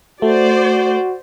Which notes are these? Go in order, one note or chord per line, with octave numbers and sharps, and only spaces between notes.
A3 F#4 C5 D5